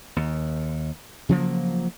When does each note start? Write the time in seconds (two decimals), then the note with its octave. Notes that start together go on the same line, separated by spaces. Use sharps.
0.16 D#2
1.29 C#3 F3 F#3 A#3